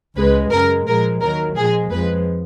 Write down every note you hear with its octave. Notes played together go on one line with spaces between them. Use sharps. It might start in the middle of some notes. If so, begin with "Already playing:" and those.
C#2 C#3 G#3 B4
F#2 C#3 G#3 A#4
A#2 F3 G#3 A#4
D#2 D#3 F#3 A#4
A#2 F3 G#3 G#4
F2 F3 G#3 B4